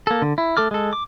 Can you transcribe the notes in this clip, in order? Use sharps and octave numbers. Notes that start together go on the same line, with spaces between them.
A#3 A4
D3
E4
A3 A4 D6 F6
G#3 A4
D6